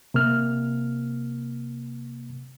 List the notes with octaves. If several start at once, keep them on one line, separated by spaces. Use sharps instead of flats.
C3 A#3 F6